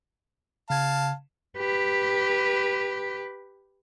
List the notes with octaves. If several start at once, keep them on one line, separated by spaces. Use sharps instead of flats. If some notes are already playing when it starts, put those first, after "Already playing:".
C#3 F5 A5 G#6
G4 B4